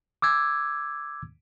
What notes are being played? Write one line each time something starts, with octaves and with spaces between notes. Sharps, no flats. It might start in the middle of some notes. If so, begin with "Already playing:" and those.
D6 E6 G#6